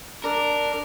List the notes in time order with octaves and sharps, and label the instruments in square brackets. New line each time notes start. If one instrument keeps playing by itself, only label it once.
[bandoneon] D4 [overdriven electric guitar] A#4